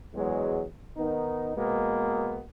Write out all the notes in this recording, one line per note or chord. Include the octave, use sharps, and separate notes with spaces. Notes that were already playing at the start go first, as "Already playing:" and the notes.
E2 F#3 G#3
D#3 B3 D#4
B2 G#3 A#3 B3